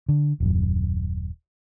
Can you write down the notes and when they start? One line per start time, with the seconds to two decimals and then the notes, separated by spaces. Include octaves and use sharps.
0.09 D3
0.40 D#1 F#2